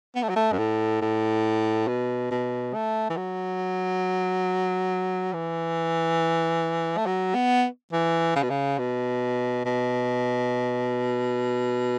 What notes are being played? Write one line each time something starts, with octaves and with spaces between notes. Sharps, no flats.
B3
A3
F#3
A3
F#2
A2
A2
B2
B2
A3
E3
F#3
E3
A3
F#3
B3
E3
C#3
B2
C#3
B2
B2